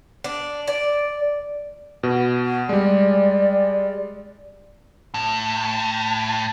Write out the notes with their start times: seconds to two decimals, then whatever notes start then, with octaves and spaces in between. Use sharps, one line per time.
0.24 D4
0.68 D5
2.03 B2
2.69 G3 G#3 D5
5.14 A2